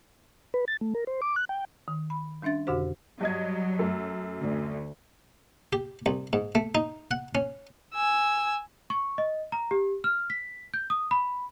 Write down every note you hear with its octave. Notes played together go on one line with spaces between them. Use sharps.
B4
A6
A3
A#4
C5
D6
F#6
G5
D#3
B5
G3 C#4 D4 E5 A6
F2 B2 D3 F#4 G4 C5
G2 F#3 D#5 G#6
F#2 A3
D2
G4
C2
G#2
A3
D#4
F#5
C#4
G#5 E6
C#6
D#5
A#5
G4
F6
B6
G6
D#6
B5